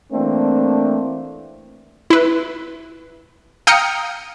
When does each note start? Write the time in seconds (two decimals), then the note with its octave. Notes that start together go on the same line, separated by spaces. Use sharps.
0.12 E3 A3 A#3 C4 D4
2.10 E4 B4
3.67 F5 G5 A#5 D#6 F6 C#7